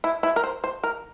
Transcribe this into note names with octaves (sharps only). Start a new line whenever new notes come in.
E4
E4
A#4
C5
C5
A#4